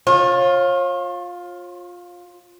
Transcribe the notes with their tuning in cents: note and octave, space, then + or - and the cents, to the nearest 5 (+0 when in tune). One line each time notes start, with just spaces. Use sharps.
F4 +15 C#5 -40